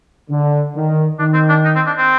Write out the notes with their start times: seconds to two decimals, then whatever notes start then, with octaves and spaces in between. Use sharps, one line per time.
0.30 D3
0.75 D#3
1.19 D#3 D4
1.34 C4
1.49 D4
1.65 D#4
1.75 C4
1.87 D4
1.97 C4